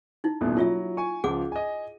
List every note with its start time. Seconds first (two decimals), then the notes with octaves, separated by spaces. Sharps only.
0.24 D#4 E4
0.41 D#1 A1 B2
0.57 F#3 E4 F4 E5
0.97 G#5 C#6
1.24 C#2 F3 G#4 F#5 D6
1.52 D#5 G#5